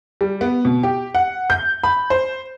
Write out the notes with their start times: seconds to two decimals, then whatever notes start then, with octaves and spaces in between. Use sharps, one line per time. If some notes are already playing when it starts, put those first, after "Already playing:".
0.21 G3
0.41 B3
0.65 B2
0.83 G4
1.15 F#5
1.50 G6
1.84 B5
2.10 C5